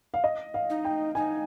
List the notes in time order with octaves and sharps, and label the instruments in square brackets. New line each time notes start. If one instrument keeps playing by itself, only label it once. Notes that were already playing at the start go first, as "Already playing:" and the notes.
[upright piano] F5
D#5
F5
[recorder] D#4
[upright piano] G5
[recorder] D#4 [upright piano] G#5